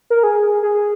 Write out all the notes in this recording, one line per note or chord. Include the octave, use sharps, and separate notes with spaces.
A#4
G#4
G#4